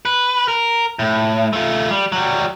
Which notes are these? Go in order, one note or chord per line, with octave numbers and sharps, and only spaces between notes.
B4
A#4
A2
A3 F4
G3
F#3 G3